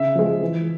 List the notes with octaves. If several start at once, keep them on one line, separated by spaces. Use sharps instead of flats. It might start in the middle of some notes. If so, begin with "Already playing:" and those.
Already playing: C#3 E5
F3 G#3
E3